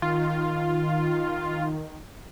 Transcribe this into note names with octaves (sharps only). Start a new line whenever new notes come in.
D#3 F4